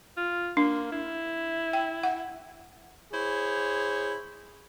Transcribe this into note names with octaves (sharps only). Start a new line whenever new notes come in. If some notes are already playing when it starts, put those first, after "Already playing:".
F4
A#3 D4
E4
G5
F#5
E4 G#4 C5 C#5